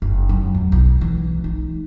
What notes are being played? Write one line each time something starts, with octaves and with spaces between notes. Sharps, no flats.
F#1
F#3
E2
B1
E3
D#4